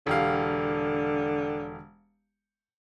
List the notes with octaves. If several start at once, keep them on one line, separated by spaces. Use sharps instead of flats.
E1 D3 G4 F5